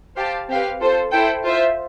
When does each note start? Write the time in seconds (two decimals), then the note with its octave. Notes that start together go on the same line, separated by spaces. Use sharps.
0.16 G4 C5 F5 A5
0.48 C4 G4 B4 F5
0.80 F4 A4 C5
1.11 E4 A4 C5 G5
1.44 F4 C5 E5